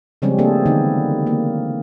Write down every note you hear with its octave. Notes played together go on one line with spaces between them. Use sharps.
C#3 F3 G3 G#3 C4 C#4
A3 A#3 C4 D4 G#4 A4
D3 D#3 B3 D#4
A#3